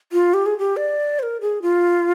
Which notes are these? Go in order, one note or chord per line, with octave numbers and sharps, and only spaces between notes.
F4
G4
G#4
G4
D5
C5
A#4
G#4
F4